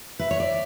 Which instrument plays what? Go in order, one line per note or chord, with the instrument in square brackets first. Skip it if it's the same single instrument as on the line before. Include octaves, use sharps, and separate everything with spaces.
[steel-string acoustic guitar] B4 [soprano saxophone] E5
[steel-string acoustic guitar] C#5
D5